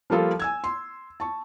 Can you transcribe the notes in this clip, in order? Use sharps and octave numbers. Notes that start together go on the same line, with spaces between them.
F3 G3 A#3 F4 A4
G#5 E6 G#6
C6
A5 C#6